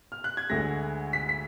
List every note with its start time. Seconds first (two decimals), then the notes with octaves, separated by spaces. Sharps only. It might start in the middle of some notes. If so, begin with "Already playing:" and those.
0.12 F6
0.24 F#6
0.37 G#6
0.50 D2 D3 G#3 A#6
1.13 B6
1.29 B6